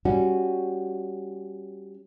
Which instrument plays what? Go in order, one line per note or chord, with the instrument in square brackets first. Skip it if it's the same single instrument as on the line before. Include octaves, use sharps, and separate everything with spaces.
[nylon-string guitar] G3 C#4 F#4